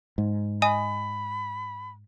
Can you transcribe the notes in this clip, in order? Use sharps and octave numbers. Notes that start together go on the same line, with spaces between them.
G#2
D#5 G#5 B5 D#6